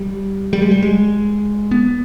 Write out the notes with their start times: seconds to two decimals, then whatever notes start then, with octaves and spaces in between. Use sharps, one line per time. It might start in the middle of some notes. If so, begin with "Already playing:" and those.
Already playing: G3
0.53 G3
0.62 G#3
0.71 G3
0.83 G#3
1.71 B3